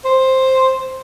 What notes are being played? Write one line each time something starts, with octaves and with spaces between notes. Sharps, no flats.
C5